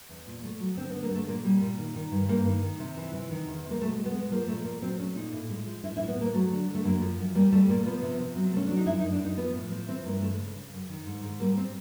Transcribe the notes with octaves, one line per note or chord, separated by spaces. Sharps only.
E2
A#2
A3
F#3
D3 C4
B3
D3
A#3
G3
A3
A#2 A#3
G3
A#2
D#3
D#3
G2
G2 A#3
D#3
D#3
C3
E3
E3
D#3
E2
C3
A#3
B2 A3
G#3
B3
G#3
F3 A#3
A#2 A3
A#2 A#3
F#3 C4
A3 C#4
A#2 D#4
A2
G#3
F3
A2 E4
E4
A2
B3
G#3
A#3
F#3 A3
D3
D3
A3
F#2 A#3
F3
F#2
G3 A#3
G3 A3
A#2 A#3
F3 B3
C3
C3
F#3
A3 C#4
F#3 D4
D#4
F#2 E4
D#4
F#2
D4
F#2 D#4
F3 B3
A2
F3
E3 C4
G2 A#3
G#3 A3
C#3
C#3
F#2
D#3
G#2
G#2
G3 A#3
C4